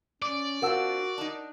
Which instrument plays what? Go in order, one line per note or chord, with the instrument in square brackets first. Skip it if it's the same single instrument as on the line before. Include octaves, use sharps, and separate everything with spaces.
[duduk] C#4 [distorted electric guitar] D5 [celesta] D6
[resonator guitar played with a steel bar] C4 D4 F4 [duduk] F#4 [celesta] A#4 F#5 E6
[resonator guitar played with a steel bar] D4 D#4